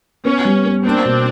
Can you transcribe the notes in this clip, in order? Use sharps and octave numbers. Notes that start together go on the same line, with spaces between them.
B3 C#4
G3
B3
A#3 C4 D4
B2